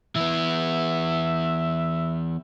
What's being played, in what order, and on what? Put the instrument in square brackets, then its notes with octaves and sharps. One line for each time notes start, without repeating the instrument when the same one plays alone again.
[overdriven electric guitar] E3 B3 [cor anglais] E5